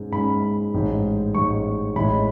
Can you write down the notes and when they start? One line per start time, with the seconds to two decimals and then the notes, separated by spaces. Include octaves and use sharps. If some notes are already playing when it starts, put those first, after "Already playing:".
Already playing: G#2 G#3 C#4
0.12 G#2 G#3 C#4 B5
0.74 A1 G#2 G#3
1.34 A1 G#2 G#3 C#6
1.95 A1 A2 G#3 B5